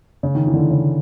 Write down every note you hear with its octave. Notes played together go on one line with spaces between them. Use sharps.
C#3
D#3
E3
D3
D#3
C#3